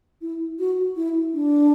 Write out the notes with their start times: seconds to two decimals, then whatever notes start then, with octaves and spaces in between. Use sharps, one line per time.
0.22 E4
0.59 F#4
0.96 E4
1.34 D4